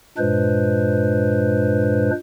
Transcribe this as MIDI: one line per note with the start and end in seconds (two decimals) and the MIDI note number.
0.18 2.11 43
0.18 2.11 46
0.18 2.11 56
0.18 2.11 62
0.18 2.11 71
0.18 2.11 72